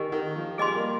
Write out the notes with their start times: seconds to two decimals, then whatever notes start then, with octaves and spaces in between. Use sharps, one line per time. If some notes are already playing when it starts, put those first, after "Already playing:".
Already playing: D#3 G4 A#4 D#5 G#5
0.12 D#3
0.36 F3
0.58 G3 G#4 D#5 G#5 C6
0.76 A#3